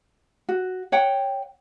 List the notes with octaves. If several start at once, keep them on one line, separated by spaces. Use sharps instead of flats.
F#4
C#5 F#5 G5